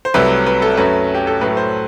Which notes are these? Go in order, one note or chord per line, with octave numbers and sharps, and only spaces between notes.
C5
C2 C3 F#3 A3 B4
B4
A4
F#2 F#3 A3 B4
G4
A4
A2 F#3 A3 B4
C5